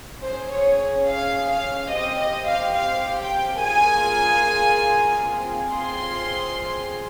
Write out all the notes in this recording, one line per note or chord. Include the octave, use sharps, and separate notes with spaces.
C#4 G#4 C5
C#5
F5
F5
C4 G4 D#5
D#5
F5
F5
G5
A#3 F4 G#4 G#5
C4 F4 G#4
C6